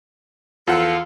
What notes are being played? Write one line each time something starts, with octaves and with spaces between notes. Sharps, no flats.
E2 F3 F4 A4 F#5 C#7